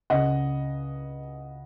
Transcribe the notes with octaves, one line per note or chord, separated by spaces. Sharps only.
C#2 C#3 D#5 F#5